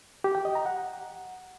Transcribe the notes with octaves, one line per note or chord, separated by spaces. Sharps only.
G4
G5
D#5
A#5
F#5